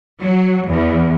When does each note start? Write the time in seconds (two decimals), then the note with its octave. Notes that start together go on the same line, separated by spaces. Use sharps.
0.21 F#3
0.67 E2